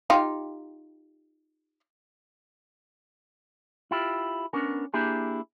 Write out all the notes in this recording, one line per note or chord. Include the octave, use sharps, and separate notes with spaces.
D#4 F4 G4
E4 F4 G4
B3 C#4 D4 A#4
A#3 D4 E4 G4 G#4